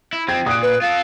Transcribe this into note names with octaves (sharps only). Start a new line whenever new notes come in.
E4
F3 C4 G5 G#6
A#2 D#6 F#6 D7
B4
F4 A4 F5